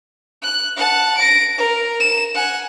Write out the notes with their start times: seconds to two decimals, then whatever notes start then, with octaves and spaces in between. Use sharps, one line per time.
0.42 F#6
0.77 F#5 A5
1.17 A#6 D7
1.58 A#4
2.00 E7
2.35 F#5 G#5